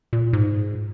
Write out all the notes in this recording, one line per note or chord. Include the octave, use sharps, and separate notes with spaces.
A#2
G#2